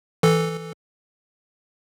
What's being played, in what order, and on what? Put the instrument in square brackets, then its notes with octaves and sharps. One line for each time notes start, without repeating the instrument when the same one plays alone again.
[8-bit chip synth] E3 A4